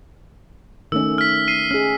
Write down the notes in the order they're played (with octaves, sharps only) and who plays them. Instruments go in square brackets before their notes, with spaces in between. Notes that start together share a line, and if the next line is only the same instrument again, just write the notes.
[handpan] D#3 A3 C#4 [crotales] E6
[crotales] F6 B6
C7 D#7
[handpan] C#4 G#4 [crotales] F6